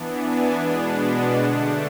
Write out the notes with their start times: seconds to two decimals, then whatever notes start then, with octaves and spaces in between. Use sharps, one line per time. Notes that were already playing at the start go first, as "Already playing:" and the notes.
Already playing: E3 B3 D4
0.16 G#5
0.57 B2 G#3 B3 D4
1.37 D3 A3 D4 F#5